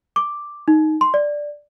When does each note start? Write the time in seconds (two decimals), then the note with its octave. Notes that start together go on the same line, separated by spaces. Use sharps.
0.16 D6
0.68 D#4
1.01 C6
1.14 D5